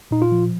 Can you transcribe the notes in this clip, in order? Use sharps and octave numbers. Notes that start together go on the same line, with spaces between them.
A#2 D#4
F4
F3